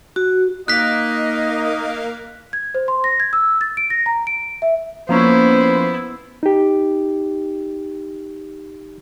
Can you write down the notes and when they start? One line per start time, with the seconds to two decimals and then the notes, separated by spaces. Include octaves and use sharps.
0.16 F#4
0.68 A#3 D#4 D#5 F#6 B6
2.53 G#6
2.75 C5
2.88 C6
3.04 A#6
3.20 G#6
3.33 E6
3.61 A6
3.77 D7
3.90 A#6
4.06 A#5
4.27 D7
4.62 E5
5.09 F3 A#3 B3 C#4 E4 C5
6.43 D#4 G4